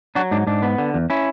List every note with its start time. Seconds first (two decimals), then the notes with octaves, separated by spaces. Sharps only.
0.15 F#3 D4 F#4
0.31 G#2 D4
0.47 G#2 D4
0.62 B3
0.78 D3
0.94 E2
1.10 C#4 E4